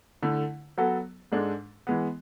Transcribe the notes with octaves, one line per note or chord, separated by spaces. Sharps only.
D3 A3 E4
F#3 B3 F#4 A4
G#2 G#3 D4 A4
E3 G#3 B3